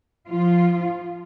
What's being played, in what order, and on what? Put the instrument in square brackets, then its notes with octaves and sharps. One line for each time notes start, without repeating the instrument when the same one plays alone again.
[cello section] F3 F4